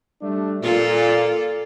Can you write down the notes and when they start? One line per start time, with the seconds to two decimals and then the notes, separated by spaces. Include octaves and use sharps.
0.22 G3 A3 D4
0.62 A#2 F4 A4 D5